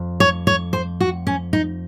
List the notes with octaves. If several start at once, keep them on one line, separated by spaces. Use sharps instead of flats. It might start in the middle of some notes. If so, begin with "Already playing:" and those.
Already playing: F2
C#5
C#5
C5
F#4
C#4
D#4